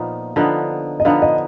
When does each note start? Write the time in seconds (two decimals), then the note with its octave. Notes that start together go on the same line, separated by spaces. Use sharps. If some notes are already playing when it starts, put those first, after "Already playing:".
Already playing: A#2 F3 B3 D#4
0.36 D3 F3 B3 D#4
1.00 D#5
1.05 D3 F3 B3 D#4 F5
1.22 D#5